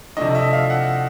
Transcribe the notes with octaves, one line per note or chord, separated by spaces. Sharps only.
C3 F3 A3 D4 D#5
E5
F5
F#5